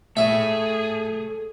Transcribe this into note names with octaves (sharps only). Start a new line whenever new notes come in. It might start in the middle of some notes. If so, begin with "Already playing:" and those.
A3 G#4 C#5 E5